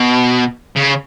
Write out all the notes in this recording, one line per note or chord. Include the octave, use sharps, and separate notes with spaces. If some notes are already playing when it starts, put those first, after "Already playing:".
Already playing: B2
C#3